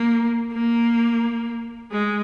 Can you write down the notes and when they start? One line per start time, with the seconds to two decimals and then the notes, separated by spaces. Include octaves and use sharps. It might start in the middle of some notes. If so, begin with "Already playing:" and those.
Already playing: A#3
0.53 A#3
1.91 G#3